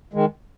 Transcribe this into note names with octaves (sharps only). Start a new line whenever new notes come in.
D#3 G#3